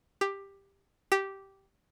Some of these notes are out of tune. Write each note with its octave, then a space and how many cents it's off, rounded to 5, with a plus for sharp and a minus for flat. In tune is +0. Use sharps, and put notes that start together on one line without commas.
G4 +10
G4 -10